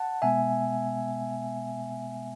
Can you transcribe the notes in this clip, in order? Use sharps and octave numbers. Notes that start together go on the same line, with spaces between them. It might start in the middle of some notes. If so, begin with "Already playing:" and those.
Already playing: F#5 A5
B2 G#3 B3 E5 G#5